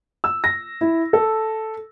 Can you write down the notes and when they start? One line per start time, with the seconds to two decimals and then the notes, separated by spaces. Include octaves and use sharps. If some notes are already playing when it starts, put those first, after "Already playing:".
0.24 E6
0.44 A#6
0.81 E4
1.13 A4